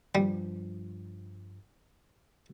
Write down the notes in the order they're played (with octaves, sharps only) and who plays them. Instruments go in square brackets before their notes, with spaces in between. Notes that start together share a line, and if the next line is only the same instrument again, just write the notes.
[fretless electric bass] G2 F3 [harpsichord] G3